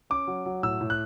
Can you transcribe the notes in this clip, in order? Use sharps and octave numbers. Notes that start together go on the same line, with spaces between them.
C#4 D6
F#3
F#3
A2 E6
A2
F#6